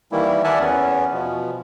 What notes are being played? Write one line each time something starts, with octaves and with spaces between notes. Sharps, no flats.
D#3 E3 G3 A#3 E4
A#4 D5 E5 F#5 G#5 A5
E2 B3 C#4
B2 F3